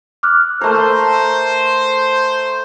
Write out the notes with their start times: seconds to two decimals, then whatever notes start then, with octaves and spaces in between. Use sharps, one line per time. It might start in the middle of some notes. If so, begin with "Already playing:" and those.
0.23 D6 F6 F#6
0.61 A3 A#4 C5